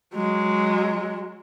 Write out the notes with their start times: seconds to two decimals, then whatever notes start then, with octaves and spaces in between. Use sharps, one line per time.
0.15 F#3 G#3